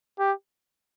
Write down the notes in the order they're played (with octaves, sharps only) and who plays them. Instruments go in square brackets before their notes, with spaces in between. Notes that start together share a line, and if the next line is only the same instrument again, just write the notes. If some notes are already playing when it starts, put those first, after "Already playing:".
[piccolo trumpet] G4